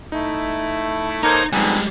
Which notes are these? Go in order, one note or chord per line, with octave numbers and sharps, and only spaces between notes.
A3 D#4 E4
A#3 D#4 A4 A#4 C5 C#5 A#5
F2 D3 G3 G#3 B3 D#4 G4 G#5